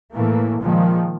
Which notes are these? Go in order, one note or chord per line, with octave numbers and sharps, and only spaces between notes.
A2 E3 A3 A#3
A#2 D#3 F3 G#3